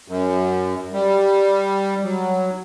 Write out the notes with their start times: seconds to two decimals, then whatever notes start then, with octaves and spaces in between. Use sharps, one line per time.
0.08 F#2
0.93 G3
2.04 F#3